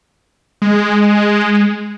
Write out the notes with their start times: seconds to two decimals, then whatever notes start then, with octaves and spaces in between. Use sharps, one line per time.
0.62 G#3